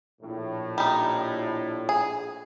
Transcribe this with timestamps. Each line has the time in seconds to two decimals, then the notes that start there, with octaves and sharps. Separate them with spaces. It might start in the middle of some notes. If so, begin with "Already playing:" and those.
0.22 A#1 A2
0.78 G3 D#4
1.89 G#4